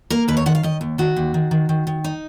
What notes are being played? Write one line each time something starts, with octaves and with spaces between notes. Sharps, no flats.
A#3 A#4
D#2 B4
C#5
D#3 F#5
F5
D#3 D#5
D#2
D#3 F#4
D#2
D#3
D#3
D#3
D#3
D#4